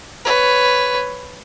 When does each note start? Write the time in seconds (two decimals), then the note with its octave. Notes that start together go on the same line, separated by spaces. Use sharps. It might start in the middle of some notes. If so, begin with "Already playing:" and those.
0.25 B4 C#5